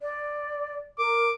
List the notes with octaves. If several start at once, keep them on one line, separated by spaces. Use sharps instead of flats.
D5
A#4 D6